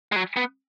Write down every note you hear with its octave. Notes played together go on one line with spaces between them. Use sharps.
G#3
F#3
B3